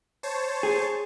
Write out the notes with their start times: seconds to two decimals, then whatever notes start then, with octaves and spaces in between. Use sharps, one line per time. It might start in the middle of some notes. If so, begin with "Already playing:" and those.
0.23 C5 C#5 A5
0.63 G#4